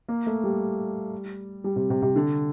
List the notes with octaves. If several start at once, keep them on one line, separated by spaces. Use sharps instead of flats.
A#3
A3
G3
G3
C3
C3
C3
D3